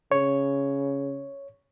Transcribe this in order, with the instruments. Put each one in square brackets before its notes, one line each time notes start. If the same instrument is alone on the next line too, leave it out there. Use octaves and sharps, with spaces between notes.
[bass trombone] C#3 [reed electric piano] C#5